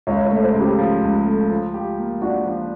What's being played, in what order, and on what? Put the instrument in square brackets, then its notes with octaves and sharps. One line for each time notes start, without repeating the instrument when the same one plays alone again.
[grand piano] C#2 [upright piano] C#5
[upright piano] C#5
[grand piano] A3
[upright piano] C5
[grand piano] C#3
[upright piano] G4
[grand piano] F3
C#2
A3
F3
G4
A#3
[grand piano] D4 [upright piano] F#4
[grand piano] F3